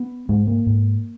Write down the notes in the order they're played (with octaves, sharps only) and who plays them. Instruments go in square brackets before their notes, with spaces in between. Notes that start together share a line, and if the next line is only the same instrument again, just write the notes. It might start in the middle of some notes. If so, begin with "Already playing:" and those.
Already playing: [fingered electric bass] B3
G#2 G#3
A#3
G#2